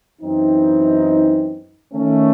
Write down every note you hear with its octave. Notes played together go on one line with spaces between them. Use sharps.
F#2 E3 C4 D#4
D#3 A3 C#4